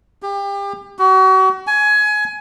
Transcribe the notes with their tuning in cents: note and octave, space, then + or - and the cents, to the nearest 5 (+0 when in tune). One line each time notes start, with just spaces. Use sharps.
G4 +30
F#4 +35
G#5 +20